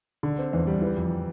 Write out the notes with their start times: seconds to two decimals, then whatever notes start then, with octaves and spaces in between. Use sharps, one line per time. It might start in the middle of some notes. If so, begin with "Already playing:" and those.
0.23 D3
0.38 C4
0.53 E2
0.67 G3
0.82 E3
0.97 F2